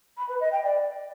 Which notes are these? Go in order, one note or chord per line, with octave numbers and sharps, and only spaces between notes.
B5
B4
D#5
G5
D5